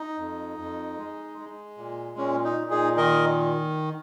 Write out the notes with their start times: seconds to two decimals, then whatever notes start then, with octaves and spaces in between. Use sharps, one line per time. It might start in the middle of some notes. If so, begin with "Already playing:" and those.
Already playing: D#4
0.18 F2
0.58 F2
0.98 G#3
1.38 G#3
1.78 A#2
2.17 A#2 C#4
2.44 D#4
2.58 A#2
2.70 D#4 G#4
2.97 D#3 A#4 D#5